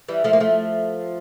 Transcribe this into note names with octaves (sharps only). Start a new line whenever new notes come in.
E3 G3
F3 A3
A#3
F3 A3